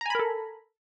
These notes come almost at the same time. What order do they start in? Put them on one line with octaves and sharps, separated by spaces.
A#5 G#5 B5 A#4 A4